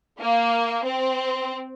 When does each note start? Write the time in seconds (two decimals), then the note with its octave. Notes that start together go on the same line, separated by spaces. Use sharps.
0.19 A#3
0.84 C4